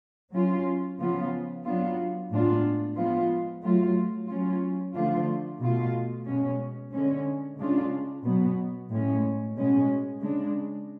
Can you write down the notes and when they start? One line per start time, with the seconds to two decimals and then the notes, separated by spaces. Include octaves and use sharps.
0.33 F#3 C#4 F4
0.99 C#3 F3 B3 F4
1.64 F#3 B3 D4 F4
2.30 A2 G#3 B3 D4 F4
2.96 F3 G#3 B3 F4
3.63 F#3 A3 F4
4.28 F#3 C#4 F4
4.94 D3 F3 A3 D4 F4
5.60 B2 A3 F4
6.26 B2 G#3 C#4
6.92 D3 G#3 C#4
7.57 C#3 G#3 D4 F4
8.24 B2 F#3 B3
8.89 A2 G#3 C#4
9.55 B2 G#3 C#4
10.21 C#3 G#3 D4